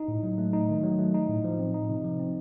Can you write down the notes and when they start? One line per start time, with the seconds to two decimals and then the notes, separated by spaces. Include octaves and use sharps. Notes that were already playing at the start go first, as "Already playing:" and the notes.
Already playing: D#4
0.08 A2
0.23 F#3
0.38 A3
0.53 D#4
0.69 D#3
0.84 F#3
0.99 A3
1.14 D#4
1.29 A2
1.44 F3
1.59 C4
1.74 D#4
1.89 C3
2.04 F3
2.20 C4